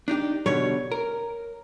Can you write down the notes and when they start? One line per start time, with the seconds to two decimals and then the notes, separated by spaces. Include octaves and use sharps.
0.08 D4 D#4 G4
0.46 B2 D3 G3 C#5
0.92 A#4